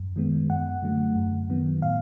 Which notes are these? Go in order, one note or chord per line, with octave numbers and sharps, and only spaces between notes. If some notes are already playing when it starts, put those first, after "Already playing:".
Already playing: F#2
D#3 G#3 B3
F#2 F#5
D3 F#3 A3
F#2
D#3 F#3 B3
A2 F5